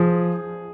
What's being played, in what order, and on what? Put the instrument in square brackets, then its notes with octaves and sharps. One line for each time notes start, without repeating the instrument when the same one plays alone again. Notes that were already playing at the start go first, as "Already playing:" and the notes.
Already playing: [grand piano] F3 [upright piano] G#4